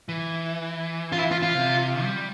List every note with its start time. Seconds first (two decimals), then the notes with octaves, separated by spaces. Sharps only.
0.09 E3
1.12 F4
1.18 E4
1.31 F4
1.43 F4
1.55 C3
2.03 G3